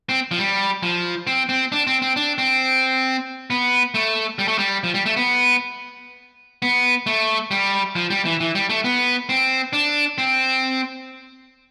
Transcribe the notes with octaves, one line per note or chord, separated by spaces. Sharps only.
C4
F3
G3
F3
C4
C4
D4
C4
C4
D4
C4
B3
A3
G3
A3
G3
F3
G3
A3
B3
B3
A3
G3
F3
G3
E3
E3
G3
A3
B3
C4
D4
C4